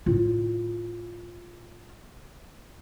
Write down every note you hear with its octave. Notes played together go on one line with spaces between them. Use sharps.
A2 F4